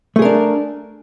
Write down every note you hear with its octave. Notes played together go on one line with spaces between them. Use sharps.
A3 D4 G#4 A#4